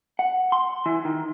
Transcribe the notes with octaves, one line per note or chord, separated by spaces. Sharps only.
F#5
C6
E3
D#3